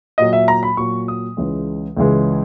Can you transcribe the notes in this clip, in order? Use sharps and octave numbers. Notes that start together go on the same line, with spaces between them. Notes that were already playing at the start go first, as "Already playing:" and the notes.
A#2 F#3 D#5
E5
A#5
B5
A#2 F#3 C#6
D#6
C#2 C#3 E3 G#3
C#2 C#3 E3 G#3